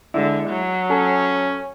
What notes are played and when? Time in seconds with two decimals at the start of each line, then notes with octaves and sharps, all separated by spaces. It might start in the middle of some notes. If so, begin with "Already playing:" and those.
0.14 D3 G#3 E4
0.49 F#3
0.90 C#4 A4